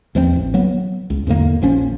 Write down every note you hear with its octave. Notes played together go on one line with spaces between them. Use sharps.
E2 F3 G3 C4
A1
F#3 B3
C#2
E2 G#2 D3 A#3
A#1 F3 C#4